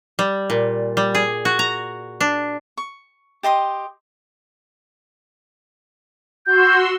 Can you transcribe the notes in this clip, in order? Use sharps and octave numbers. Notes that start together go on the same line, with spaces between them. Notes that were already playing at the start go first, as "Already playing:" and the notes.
G3
A#2
G3
G#4
F#4
A#5
D4
C#6
G4 D#5 C6 D#6
F#4 C6 E6 G6